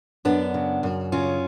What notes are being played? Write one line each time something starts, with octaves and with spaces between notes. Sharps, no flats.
F#2 B3 D4
C#3
F#2
C#3 C#4 F4